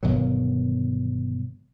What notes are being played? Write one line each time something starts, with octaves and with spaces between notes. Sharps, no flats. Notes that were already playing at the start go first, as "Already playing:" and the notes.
G1 B2 D#3 F#3